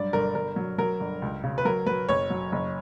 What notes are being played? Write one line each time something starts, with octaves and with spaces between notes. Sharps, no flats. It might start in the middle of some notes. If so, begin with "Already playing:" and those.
Already playing: G2 F#3 D5
G1 A#4
G1 A#4
F#3
F#3 A#4
G1
C#2
C#3
B4
F#3 A#4
F#3 B4
F#1 C#5
F#3
F#1